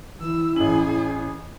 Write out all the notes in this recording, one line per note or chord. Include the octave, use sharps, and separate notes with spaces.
E3 E4 E6
A1 C#4 G#4 F#7